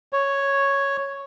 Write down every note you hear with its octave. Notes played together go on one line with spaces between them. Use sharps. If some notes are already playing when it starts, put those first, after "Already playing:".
C#5